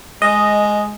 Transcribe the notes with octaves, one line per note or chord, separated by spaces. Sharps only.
G#3 D#5